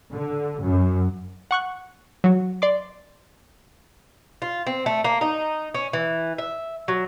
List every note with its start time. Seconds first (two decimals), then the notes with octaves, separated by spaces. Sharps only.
0.11 D3
0.61 F#2
1.51 F#5 C#6 F#6
2.24 F#3 F#4
2.62 D5 C6 D6
4.42 F4
4.67 C4
4.86 A3
5.04 A#3
5.21 D#4
5.74 C#4
5.93 E3
6.38 E5
6.88 F#3